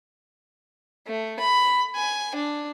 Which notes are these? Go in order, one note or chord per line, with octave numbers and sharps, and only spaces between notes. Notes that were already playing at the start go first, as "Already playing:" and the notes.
A3
B5
G#5
D4